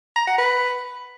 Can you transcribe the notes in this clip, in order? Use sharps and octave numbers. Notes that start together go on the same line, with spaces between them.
A#5
F#5
B4